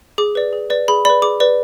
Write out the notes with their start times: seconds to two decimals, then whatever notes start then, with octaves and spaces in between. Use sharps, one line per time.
0.18 G#4 D6
0.35 B4 D5
0.53 G#4
0.70 B4 D5
0.88 G#4 B5
1.05 B4 D5 B5
1.22 G#4 D6
1.40 B4 D5